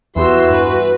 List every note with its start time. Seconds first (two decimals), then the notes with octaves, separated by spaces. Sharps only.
0.16 E2 E3 B3 F#4 G4 C6 E6
0.50 G2 B4